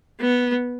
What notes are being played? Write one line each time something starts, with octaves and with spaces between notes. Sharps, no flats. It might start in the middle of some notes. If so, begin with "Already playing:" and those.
B3